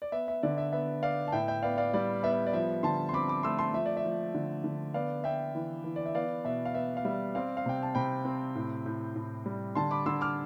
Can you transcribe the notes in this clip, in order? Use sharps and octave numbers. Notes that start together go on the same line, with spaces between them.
D5
B3 E5
E5
D3 D5
E5
B3 E5
B3 D5 F5
A5
A2 E5 G5
E5 G5
B3 D5 F5
D5 F5
G3 D5
B3 E5
D5
D5
F3 E5
D3 A5 C6
C6
C4 B5 D6
B5 D6
A3 C6 E6
A5 C6
F3 E5
D5
E5
F3
D3
D3
B3 D5 F5
B3 E5 G5
E3
E3
D5
E5
B3 D5 F5
B2 E5
F5
B3 E5
F5
G3 E5
C4 D5 F5
F5
C3 G5
A5
C3 G5 B5
C4
A2
A2
A2
G3
D3 A5 C6
B5 D6
D3 C6 E6
D6 F6